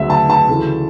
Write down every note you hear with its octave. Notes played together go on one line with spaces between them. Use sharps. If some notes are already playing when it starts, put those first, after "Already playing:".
Already playing: D2 C#3 F#3 E5
A5
A5
D2 C#3 E3 A3